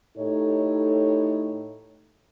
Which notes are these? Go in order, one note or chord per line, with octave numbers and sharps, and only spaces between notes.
A2 D#4 G4 A4 C#5